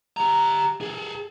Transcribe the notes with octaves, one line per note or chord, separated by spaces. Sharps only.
G4 A#5
G#4 A4